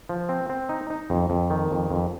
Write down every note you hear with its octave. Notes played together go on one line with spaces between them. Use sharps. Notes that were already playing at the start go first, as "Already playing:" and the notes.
F3
C4
C4
D#4
D#4
F2
F2
D#3
F2
F2